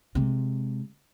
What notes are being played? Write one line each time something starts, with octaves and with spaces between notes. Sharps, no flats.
C3 G#3